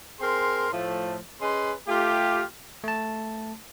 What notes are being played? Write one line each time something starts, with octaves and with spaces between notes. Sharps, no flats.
C4 G#4 A#4 C6
A2 F3 A3
C#4 G#4 B4 D#5 C6
A3 F4 G4
A3 A5